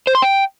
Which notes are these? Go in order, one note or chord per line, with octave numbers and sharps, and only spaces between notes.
C5
C6
G5